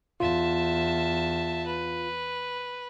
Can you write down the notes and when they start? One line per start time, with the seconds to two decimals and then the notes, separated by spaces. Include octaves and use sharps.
0.20 E2 F4 E5 A5
1.66 B4